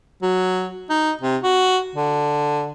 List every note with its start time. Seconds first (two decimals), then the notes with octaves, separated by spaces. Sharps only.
0.22 F#3
0.90 D#4
1.22 C3
1.43 F#4
1.96 D3